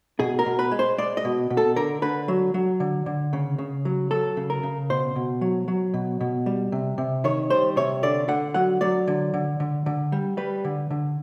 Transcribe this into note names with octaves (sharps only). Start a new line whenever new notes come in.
B2 G#4
A#4
B2
B4
G#3
C5
G#3 D5
D#5
B2
B2
A4
D3 A#4
D3 B4
F#3
F#3
D3
D3
C#3
C#3
F#3
F#3 A4
C#3
A#4
C#3
B2 C5
B2
F#3
F#3
B2
B2
G3
C3
C3
D#3 C#5
G3 C5
C3 C#5
D3 D5
D3 F#5
F#3 F#5
F#3 D5
D3
D3
D3
D3
G3
G3 B4
D3
D3